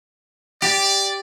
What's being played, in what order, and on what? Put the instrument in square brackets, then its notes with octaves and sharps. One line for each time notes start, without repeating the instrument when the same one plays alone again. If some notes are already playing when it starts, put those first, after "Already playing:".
[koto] G4 [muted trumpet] D5